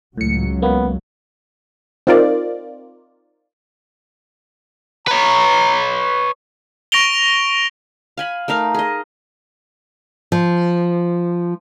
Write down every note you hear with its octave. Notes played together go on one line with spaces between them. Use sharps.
C#2 A2 F#3 C#7
A#3 B3
C4 D#4 F4 A#4 D5
B4 C#5 A#5
C#6 A#6 D7 F7 G7
F5 G#5 B5
A3 D#4 A#4 F5
G#4 D#5
F3